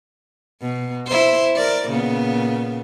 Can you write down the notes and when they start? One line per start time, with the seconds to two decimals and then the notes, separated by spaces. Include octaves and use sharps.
0.61 B2
1.07 E4 C5
1.55 A#4 D5
1.88 A#2 C#3 B3